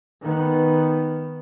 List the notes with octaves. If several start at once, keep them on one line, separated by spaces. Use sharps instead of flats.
D#3 B3